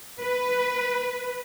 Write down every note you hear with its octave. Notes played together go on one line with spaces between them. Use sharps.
B4